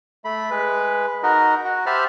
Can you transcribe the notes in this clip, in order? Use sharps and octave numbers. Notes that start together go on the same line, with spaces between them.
A3 B5
G#3 B4
D#4 F#4 A#4 D#5
F#4
G4 C5 E5 A5 B5 F6